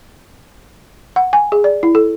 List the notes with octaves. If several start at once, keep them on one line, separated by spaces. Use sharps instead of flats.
F#5
G#5
G#4
D5
E4
A4